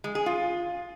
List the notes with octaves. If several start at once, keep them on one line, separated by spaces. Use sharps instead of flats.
G#3
G#4
F4